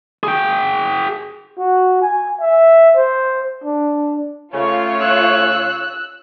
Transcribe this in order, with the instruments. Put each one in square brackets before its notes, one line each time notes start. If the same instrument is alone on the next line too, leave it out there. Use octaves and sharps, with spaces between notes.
[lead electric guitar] G#4 G5
[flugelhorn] F#4
G#5
E5
C5
D4
[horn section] C#3 A3 C#4 [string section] F4 C#5
[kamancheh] E6 F#6